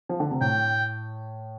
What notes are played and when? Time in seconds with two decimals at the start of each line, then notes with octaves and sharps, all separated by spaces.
0.09 F3
0.20 D3
0.31 C3
0.41 A2 G5